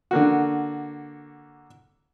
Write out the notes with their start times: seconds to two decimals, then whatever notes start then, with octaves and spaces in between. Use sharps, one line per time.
0.11 D3 A#3 F#4